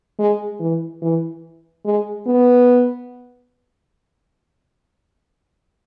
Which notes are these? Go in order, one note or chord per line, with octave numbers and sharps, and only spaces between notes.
G#3
E3
E3
G#3
B3